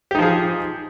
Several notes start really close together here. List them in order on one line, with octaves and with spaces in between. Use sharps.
G4 D#4 F3 G#4